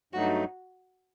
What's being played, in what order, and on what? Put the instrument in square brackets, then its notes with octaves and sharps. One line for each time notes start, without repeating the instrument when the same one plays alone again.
[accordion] G2 F#3 A3 D#4 [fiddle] F#4